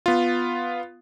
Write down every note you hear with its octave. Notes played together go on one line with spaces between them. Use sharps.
B3 F4